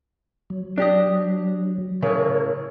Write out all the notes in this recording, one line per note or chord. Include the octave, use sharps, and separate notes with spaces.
F#3
D4 G4 D#5
A2 C#3 A#4 C#5